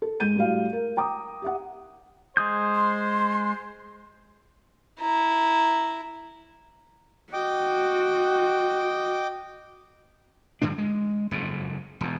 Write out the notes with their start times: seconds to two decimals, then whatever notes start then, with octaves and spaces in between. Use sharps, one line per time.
0.02 A4
0.20 G#2 G#3 G6 D#7
0.36 A2 G3 F#4 F5
0.73 A#4
0.97 G5 A#5 D6 D#6
1.42 G4 E5 F#5
2.37 G#3 C5 D#6 G6
2.75 C6
5.00 E4 A#5
7.33 F#4 D#5 G5 D6
10.62 G2 D3 F3 D4
10.78 G#3
11.31 F#1 F2 G#2
12.01 E1 E2